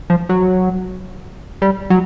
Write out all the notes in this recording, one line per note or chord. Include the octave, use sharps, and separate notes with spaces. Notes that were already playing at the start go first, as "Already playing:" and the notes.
F3
F#3
G3
F#3